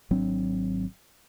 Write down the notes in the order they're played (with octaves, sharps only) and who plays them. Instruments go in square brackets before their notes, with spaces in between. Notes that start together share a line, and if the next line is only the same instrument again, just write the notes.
[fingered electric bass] G#1 F#3 C4 D4